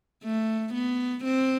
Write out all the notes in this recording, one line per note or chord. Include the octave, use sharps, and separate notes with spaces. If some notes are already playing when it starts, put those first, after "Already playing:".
A3
B3
C4